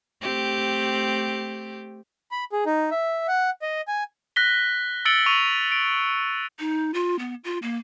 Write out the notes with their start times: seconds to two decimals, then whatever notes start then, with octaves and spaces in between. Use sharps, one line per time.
0.22 A3 C4 G4
2.31 B5
2.53 G#4
2.66 D#4
2.91 E5
3.28 F#5
3.62 D#5
3.88 G#5
4.36 F#6 A#6 B6 G7
5.05 E6 A6 C#7 D7 F#7 G7
5.26 C#6 D#7 F7
5.72 D7
6.59 D#4
6.94 F4
7.19 B3
7.44 F4
7.62 A#3